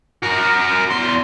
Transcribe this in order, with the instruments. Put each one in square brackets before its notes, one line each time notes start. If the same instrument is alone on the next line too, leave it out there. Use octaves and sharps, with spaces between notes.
[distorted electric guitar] F#4 A#4
E2 C6